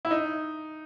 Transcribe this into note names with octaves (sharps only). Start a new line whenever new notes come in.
E4
D#4